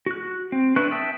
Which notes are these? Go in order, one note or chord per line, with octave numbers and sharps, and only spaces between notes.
F#4 F#6
C4
D4 E4 B4 C#6 F#6
E5 G5 A5 D#6 E6